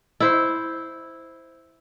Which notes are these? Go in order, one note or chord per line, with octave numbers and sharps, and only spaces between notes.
E4 C5